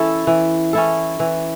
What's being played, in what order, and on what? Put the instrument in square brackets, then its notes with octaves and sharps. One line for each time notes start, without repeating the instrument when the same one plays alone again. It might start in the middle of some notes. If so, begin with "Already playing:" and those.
Already playing: [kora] E3 C#4 E4 A4
E3
C#4 E4 A4
E3